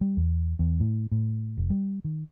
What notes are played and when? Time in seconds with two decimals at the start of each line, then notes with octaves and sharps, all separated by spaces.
0.01 G3
0.17 E2
0.59 E2
0.80 A2
1.12 A2
1.57 F1
1.70 G3
2.04 D#3